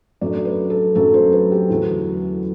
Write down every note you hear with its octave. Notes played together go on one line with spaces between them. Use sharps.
F#2 F#3 A3 D4 D5
B4
A4
F#2 F#3 A3 D4 A4
C5
B4
G4
E2 D3 F#3 A3 A4